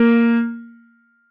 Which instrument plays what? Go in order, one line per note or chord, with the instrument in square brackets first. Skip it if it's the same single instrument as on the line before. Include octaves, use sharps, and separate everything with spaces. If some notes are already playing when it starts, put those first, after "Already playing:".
Already playing: [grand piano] A#3